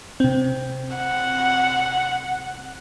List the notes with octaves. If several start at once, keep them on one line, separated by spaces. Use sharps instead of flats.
C3 C4
F#5